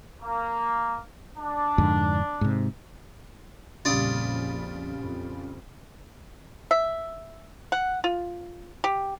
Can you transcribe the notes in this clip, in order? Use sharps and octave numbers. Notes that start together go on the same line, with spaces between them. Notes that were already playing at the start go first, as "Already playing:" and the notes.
A#3
D4
F2 G#2 D3
G#2 C3
A#1 F2 C#3 G3 F4 D5 D#6
F2
E5
F#5
F4
G4